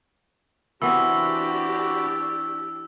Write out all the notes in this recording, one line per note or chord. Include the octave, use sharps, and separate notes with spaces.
E3 B3 C4 D4 F#4 G4 B5 E6